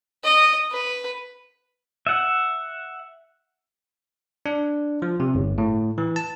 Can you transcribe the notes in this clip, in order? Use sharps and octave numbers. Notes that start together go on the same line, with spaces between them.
D#5
B4
E5 F#5
D4
F3
C3
G1
A2
E3
A5